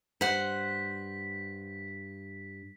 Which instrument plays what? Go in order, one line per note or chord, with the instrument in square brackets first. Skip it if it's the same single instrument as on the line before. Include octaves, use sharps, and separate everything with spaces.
[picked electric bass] G2 [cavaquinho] C5 F#5 [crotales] B6